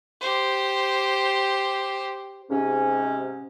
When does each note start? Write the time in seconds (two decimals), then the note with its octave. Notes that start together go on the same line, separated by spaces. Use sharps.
0.21 G4 C5
2.50 G#2 C3 C#4